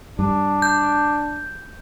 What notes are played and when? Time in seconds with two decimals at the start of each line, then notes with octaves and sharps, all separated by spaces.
0.19 G2 D4
0.62 G6